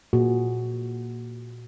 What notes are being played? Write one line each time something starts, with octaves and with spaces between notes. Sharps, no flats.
A#2 F#4 G#4